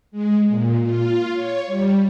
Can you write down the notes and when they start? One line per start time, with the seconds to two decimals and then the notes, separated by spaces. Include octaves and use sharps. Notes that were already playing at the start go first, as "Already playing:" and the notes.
0.12 G#3
0.48 A#2
0.81 F4
1.33 C#5
1.67 G3